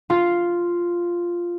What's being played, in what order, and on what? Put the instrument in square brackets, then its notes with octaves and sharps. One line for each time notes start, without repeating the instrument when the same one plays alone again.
[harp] F4